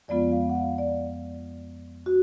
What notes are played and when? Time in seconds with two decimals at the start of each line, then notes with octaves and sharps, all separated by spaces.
0.08 F2 F3 G#3 B3 F4 D5
0.32 F5
0.50 F#5
0.55 F5
0.78 D5
2.06 F#4